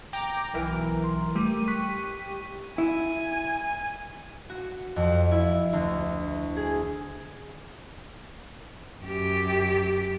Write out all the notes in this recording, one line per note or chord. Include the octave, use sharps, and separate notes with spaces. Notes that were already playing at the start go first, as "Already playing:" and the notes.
G5 A#5 D6
B1 E3 A#4
C6
G3 A3 G4 D#7
C#6 F#6 B6
E4 G#5
F#4
F2
E4
D2
G#4
F#2 G4